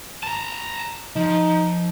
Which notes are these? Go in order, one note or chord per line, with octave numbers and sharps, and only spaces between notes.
A5 A#5
F3 D#4